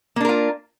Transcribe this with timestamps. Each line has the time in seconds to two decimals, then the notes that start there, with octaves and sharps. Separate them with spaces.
0.16 A#3
0.20 D4
0.25 A#4
0.29 F4